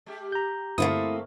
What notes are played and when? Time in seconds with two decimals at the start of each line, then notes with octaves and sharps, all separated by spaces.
0.06 G#3 G4
0.32 G4 A#5 G6
0.78 G2 D3 A3 A#3 C4 E4 F4 D#6